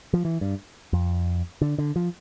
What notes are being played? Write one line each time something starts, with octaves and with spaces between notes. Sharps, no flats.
F3
E3
G2
F2
D3
D3
F3